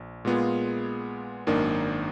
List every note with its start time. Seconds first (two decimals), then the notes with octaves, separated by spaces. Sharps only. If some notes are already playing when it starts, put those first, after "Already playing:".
Already playing: A#1
0.25 A#2 G#3 B3 F4 G#4
1.47 G#1 F#2 D#3 A#3 D4